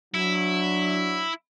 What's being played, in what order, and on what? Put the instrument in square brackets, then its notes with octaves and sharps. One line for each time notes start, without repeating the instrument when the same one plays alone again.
[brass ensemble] F#3 D4 [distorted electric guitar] E4